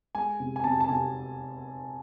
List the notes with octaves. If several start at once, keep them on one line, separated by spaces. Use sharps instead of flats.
G#3 G#5
C3
G#5
C3 A5
A5
C3 G#5